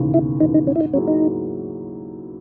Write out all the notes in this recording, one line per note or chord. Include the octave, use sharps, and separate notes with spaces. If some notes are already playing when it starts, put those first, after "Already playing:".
Already playing: E1 D#2 C#3 E3
E1 E4
D#2 C#3 E3 D#4
D#4
G#2 C#4
E4
D#4
F#3 A#3 C#4 E4 G#4
D#4
G#2